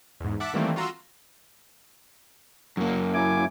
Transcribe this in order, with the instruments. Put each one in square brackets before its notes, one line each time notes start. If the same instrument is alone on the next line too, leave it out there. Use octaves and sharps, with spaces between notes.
[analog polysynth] E2 G#2
E5 F#5 A5 D6 F#6 B6
D#3 E3 G3 A3 A#3 C4
F4 F#4 A#5 C6 E6
[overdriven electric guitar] F#2 A#3
[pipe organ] E4 G#5 D6